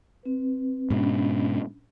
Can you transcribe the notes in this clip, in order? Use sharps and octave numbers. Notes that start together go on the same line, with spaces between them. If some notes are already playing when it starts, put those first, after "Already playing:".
C4 B4
G#2 B2 C#4 D4 B5